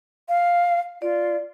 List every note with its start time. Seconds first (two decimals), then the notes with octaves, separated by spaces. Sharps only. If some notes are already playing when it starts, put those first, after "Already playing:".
0.29 F5
1.02 F4 D5